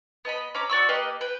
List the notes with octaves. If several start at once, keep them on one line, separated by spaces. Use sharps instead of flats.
B3 D#5 A5 B5
C#4 A#5 B5 D6
F#4 D5 C#6 E6
A#3 G4 B4 D#5
B4 G5